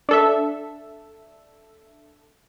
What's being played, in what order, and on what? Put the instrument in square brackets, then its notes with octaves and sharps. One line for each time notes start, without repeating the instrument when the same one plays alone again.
[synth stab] D4 A4 E5